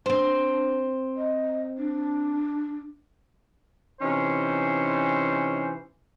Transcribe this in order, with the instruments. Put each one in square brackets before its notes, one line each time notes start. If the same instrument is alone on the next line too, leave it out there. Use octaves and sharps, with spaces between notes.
[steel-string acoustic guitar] C4 C5 [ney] D4
[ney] D#5
D4
[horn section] C3 E3 C#4 D#4 C5